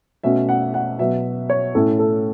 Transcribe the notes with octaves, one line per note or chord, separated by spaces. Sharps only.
B2 A3 C#4 E5
F#5
F#5
B2 F#3 B3 E5
C#5
A2 A3 C#4 A4
A4